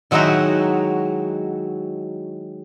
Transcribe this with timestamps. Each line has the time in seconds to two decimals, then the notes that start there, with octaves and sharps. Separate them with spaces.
0.11 D#3 F#3 G#3 D#4 E4 F#4